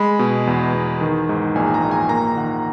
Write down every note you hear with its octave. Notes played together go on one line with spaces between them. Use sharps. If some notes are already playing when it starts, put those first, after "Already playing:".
Already playing: G#3 B5
B2
E2
E2
D#3
G#2
A#1 G#5
A#5
A#1
G#5
A#3 A#5
D#3 F#5